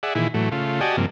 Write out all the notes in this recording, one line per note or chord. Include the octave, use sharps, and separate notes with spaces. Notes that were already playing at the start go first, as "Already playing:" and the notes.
G#4 D5 E5 F#5
A#2 D#3 E3 E4 G#4
A2 E3 F#3 A3
C#3 A3 F4
F#4 G4 D5 D#5 G#5 A5
G2 C3 F3 A#3